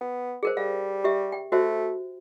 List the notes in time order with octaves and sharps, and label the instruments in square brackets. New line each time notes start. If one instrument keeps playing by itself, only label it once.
[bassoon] B3
[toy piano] G#4 A#4 C5
[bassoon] G3 [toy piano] F5
[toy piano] G4 E5
G5
[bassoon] A3 [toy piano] F#4 C5 E5